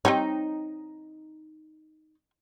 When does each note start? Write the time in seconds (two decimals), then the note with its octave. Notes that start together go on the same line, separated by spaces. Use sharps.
0.05 C4 D#4 G4 C#5